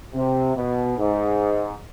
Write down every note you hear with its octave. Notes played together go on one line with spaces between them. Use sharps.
C3
B2
G#2